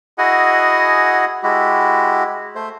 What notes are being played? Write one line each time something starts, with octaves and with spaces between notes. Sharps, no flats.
E4 F#4 G#4 D#5 F#5 G#5
G#3 E4 F#4 G4
A3 C5